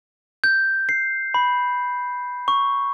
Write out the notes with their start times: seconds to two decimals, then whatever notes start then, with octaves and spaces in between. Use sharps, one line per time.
0.44 G6
0.89 C7
1.34 B5
2.48 C#6